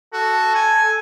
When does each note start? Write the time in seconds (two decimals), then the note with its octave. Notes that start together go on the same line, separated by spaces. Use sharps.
0.13 F#4 A4
0.55 G#5